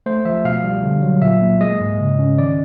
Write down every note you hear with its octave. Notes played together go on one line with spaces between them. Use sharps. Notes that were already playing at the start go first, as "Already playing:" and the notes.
A3 C5
F3 E5
B2 F5
G3
D3
F#3
A#2 E5
A#3
G#3 D#5
G#2
C#3
C#4
D#3 D5